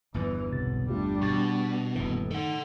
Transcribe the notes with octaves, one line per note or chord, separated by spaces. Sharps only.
G1 E2 G2 E3
B1 C3 A6
G3 A3 D4 F4 G4
B2 C#6 A6
D#1 F#2 A2 E3
D#3 A4 F#5